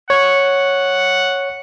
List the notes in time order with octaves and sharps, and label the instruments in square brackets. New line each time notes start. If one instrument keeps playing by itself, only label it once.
[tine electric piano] C#5 [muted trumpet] F#5